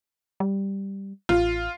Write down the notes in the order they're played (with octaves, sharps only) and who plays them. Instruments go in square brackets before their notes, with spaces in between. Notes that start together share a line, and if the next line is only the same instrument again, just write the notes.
[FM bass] G3
[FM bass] A1 [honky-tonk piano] F4